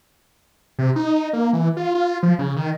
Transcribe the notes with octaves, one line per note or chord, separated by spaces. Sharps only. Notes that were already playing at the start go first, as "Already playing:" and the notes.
C3
D#4
A#3
E3
F4
F4
F3
C#3
D#3